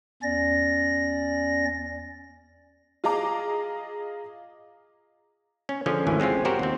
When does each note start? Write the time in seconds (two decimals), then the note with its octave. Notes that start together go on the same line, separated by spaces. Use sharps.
0.23 E2 C#4 D5 A#6
3.04 F4 G#4 D#5 A#5 D6
5.69 C#4
5.86 D3 F3 C#4 G#4
6.07 G#1 D2 E3 G#5
6.20 G#3 C4 C#4 F4
6.45 F#4 G4 A#4 C5 F#5
6.59 D#2 C4